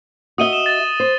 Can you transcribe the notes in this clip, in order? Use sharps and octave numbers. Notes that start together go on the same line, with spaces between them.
F#4 D#5 E5 D#6 D#7 G7
E7
A6
C5